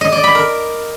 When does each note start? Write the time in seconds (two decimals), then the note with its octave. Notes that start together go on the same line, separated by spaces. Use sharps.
0.01 D#5
0.12 D5
0.24 B5
0.35 A#4